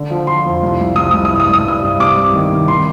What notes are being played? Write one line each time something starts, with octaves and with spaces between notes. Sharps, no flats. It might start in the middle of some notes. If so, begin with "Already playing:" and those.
Already playing: D3
F3
F3 C6
F2
C2
C2
C2 D#6
C2 D#6
D#6
G2
D#6
G2
D#6
G2 D#6
G2
C3 D6
C2
D#3
C3
D#3 C6